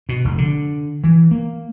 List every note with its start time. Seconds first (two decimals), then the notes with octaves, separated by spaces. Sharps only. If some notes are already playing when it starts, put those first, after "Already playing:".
0.09 B2
0.25 F1
0.38 D3
1.04 E3
1.31 A#3